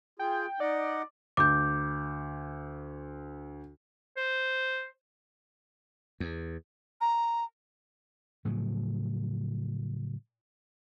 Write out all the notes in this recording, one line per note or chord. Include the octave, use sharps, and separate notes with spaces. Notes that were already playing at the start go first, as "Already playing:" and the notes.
F4 G#4 G5
D#4 D5 D#5 F#5
D2 D6 G6
C5
E2
A#5
A2 C#3 F3 F#3